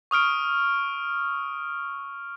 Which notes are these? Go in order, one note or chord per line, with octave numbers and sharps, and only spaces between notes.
C#6 D#6 F6 D7